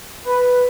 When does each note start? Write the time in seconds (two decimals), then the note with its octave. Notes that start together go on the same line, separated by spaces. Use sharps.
0.22 B4